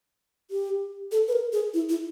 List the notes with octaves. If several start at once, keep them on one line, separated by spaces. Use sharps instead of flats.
G4
A4
B4
A#4
G#4
E4
E4